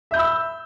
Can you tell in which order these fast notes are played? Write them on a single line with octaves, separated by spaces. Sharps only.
E5 G6 B5 E6